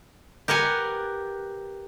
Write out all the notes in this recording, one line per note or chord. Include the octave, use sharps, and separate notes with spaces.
G4 A#4 B4 F#5 G#5